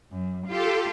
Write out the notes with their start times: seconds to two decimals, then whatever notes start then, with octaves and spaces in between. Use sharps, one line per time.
0.11 F#2
0.47 F4 G4 A4